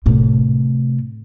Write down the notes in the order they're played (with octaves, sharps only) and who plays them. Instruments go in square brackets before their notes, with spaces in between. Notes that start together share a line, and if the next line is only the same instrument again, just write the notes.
[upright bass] A2 C3